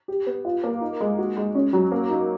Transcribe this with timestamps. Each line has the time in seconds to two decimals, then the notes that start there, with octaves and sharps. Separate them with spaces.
0.08 G4
0.26 B3
0.45 F4
0.63 A#3
0.81 D#4
1.01 G#3
1.18 F#4
1.37 G#3
1.55 C#4
1.73 F#3
1.92 A#3
2.10 D#4